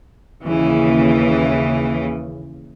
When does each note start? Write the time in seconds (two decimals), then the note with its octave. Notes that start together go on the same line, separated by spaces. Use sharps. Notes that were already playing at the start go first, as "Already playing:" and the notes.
0.43 D#2 C#3 E3